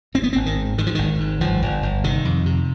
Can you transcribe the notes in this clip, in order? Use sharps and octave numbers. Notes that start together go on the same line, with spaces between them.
G#1 C4
B3
C4
G#1
D#3
G#2
G#2 D#3
F3
G#1 D#3
G#2
G1 F3
G1
G1
C3 D#3
F2
C3